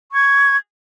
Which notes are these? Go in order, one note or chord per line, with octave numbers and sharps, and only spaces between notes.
C#6 G#6